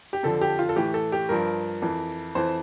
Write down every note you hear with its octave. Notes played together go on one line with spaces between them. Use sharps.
G4
F2 D3 F3 A4
G4
F4
A4
A2 E3 G4
A4
G4
G2 F3 A#4
F2 E3
F2 E3 C5